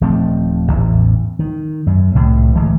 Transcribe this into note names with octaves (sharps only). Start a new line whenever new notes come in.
D#1 F3 A3 C4
A1 E2 A2
D#3
F#2
C2 A2 D#3
D1 E3 G#3 A3